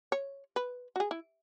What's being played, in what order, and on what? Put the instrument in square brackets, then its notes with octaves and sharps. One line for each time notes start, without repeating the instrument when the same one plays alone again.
[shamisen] C#5
B4
F#4
G#4
E4